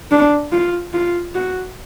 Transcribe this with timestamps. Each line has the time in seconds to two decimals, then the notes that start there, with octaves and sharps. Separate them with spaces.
0.11 D4
0.52 F4
0.93 F4
1.35 F#4